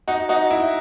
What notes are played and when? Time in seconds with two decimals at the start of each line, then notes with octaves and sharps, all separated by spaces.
0.08 D#4 F#4
0.29 D#4 F#4
0.50 E4